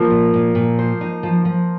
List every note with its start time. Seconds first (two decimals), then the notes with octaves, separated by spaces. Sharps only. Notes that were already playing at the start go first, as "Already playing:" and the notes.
Already playing: F3 A#3
0.10 A#2
0.34 A#2
0.55 A#2
0.79 C5
1.01 D#4
1.23 F3
1.45 F3